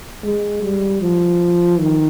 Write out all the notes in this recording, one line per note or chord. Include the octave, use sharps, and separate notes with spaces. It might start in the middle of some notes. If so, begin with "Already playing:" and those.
G#3
G3
F3
D#3